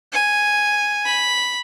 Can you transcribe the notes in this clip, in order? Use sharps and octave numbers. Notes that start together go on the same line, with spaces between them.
G#5
B5